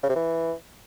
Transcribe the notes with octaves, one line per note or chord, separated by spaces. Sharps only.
C#3
C3
E3